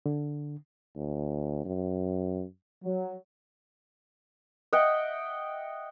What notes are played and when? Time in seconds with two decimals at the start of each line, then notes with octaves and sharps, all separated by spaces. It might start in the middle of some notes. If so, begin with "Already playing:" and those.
0.06 D3
0.96 D2
1.65 F#2
2.84 F#3
4.73 D#5 E5 F#5 G5